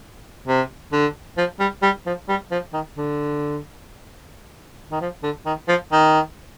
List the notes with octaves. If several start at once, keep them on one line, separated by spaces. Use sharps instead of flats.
C3
D3
F3
G3
G3
F3
G3
F3
D#3
D3
D#3
F3
D3
D#3
F3
D#3